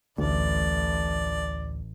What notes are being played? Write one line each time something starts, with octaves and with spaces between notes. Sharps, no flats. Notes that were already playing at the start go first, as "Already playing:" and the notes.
A1 D2 A2 D5